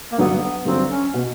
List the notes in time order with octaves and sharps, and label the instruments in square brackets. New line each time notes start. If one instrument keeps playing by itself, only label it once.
[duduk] A#3
[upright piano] G2 D3 F#3 [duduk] B3
[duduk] B3
[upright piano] G2 D3 F#3 [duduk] C4
[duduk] C#4
[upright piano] B2